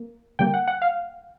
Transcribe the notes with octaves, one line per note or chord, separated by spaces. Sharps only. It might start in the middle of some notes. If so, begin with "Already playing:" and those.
Already playing: A#3
D3 G3 A#3 G5
F#5
F#5
F5